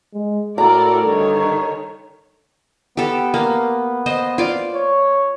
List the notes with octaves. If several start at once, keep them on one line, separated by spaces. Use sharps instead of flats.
G#3
A2 F#4 A4 A#4 D5 A#5
G2 D3 D#3 A4 C#5
B3 G4 A4
A#3
C5 D#5
F4 D5
C#5